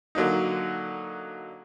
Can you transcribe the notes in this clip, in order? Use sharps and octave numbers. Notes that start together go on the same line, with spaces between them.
D3 F#3 A#3 D#4